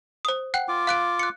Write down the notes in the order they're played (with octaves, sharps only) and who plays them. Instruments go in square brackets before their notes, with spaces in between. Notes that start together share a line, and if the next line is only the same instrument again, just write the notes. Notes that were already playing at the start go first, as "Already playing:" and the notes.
[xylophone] C5 D#6
F#5 G5 F#6
[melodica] F4 D6
[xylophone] F5 F#6 D7
F#6 C#7